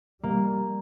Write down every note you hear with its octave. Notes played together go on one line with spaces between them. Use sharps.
G3 A#3